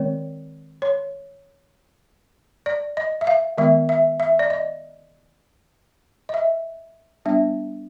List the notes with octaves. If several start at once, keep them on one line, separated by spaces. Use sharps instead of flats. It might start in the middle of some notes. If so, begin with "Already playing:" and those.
Already playing: D#3 G#3 C4 C#5
C#5
D5
D#5
E5
F5
D#3 G#3 B3 E5
E5
E5
D5
D#5
D#5
E5
G3 B3 D4 E5